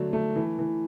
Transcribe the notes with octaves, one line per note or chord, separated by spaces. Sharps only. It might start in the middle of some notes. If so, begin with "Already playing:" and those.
Already playing: D3 F#3 A3 D4
A3
E3
E3